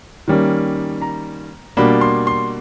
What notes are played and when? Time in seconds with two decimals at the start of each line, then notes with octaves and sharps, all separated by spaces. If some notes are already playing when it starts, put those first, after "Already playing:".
0.28 D#3 G3 A#3 C#4
1.02 A#5
1.77 B2 G3 A#3 D4 B5
2.01 C6
2.27 C6